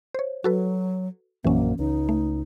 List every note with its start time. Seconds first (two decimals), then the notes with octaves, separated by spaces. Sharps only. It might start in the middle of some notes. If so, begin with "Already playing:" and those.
0.14 C5 C#5
0.44 F#3 F#4 A4 B4
1.44 A#1 F#2 E3 A#3 C#4
1.79 C#2 D#4
2.09 A3